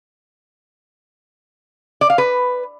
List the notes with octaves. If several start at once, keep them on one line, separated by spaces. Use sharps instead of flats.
D5
F5
B4